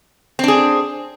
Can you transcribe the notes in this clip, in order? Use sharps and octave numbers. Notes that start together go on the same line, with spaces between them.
C4 D4 G#4